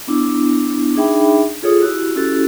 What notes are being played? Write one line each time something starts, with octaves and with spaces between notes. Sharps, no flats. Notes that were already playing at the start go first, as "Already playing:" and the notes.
B3 D4 E4
D4 D#4 G#4 E5 G5 B5
F4 G#4 A4 C#5 D#6
E4 F#4 G4
C#4 E4 F#4 G4 A4